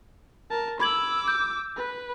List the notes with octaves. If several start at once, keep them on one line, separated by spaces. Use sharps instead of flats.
A#4 A5
B5 D6 E6 G#6 F#7
G6
B4